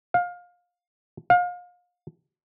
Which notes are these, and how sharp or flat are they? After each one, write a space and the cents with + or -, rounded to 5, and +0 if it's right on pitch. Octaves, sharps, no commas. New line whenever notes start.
F5 +25
F5 +35